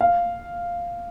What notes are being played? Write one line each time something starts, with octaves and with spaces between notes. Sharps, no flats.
F5